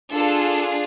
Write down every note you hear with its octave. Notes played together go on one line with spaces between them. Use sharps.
D4 F4 G#4 A4